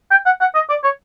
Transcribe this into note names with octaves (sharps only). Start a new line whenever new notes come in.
G5
F#5
F#5
D#5
D5
C#5